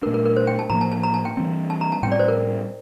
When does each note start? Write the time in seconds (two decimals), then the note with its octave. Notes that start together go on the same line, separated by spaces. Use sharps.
0.03 D4 A#4
0.06 A#2 A3
0.14 A#4
0.26 A#4
0.36 C5
0.47 G5
0.59 A5
0.70 A2 F3 A#3 A#5
0.81 A5
0.92 A5
1.03 A#5
1.14 A5
1.25 G5
1.37 E3 G3 C4
1.70 A5
1.81 A#5
1.92 A5
2.03 A2 G3 C4 G5
2.12 D5
2.19 C5
2.28 A#4